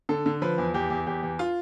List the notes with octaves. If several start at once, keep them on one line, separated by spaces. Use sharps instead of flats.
D3 A4
D3
F3 B4
E2
E2 G4
E2
E2 G4
E2
F4